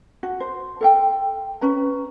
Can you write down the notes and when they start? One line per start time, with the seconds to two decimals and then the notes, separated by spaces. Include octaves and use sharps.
0.23 F#4
0.40 C5
0.81 A4 F5 G5
1.61 C#4 B4 A#5